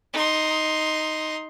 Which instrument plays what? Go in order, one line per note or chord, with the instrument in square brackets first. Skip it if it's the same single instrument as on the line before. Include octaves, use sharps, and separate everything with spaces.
[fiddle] D#4 C6